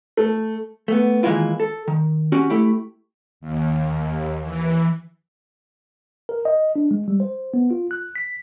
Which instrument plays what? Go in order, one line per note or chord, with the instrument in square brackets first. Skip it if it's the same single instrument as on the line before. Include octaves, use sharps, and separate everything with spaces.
[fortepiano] A3
[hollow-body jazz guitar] A3 B3
D#3 E3 G#3 A#3 E4 F4
A4
D#3
C#4 F#4 G4
A3 E4 G4
[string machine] D#2
E3
[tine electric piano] A#4
D#5
D4
G#3
G3
C5
B3
F4
F#6
B6